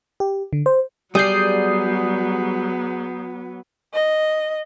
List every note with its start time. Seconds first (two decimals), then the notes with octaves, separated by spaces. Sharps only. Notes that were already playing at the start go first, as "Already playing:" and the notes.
0.20 G4
0.53 D3
0.66 C5
1.15 F#3 G3 B3 G#4 D5 D#6 G6 C7
3.94 D#5